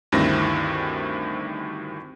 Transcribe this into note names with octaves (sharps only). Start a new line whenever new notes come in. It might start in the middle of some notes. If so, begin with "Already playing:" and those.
D2 G2 D#3 C4 E4 A#6